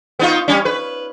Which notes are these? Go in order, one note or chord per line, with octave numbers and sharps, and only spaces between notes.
B3 D#4 F4
G3 C#4
B4